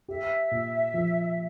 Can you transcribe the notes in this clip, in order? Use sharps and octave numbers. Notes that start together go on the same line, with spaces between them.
G4 E5
A#2
F3